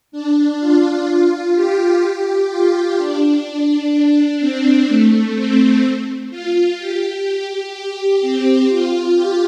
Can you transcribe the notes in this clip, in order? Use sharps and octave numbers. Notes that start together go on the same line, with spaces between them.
D4
F4
G4
G4
F4
D4
C4
A3
C4
F4
G4
G4
C4
F4
G4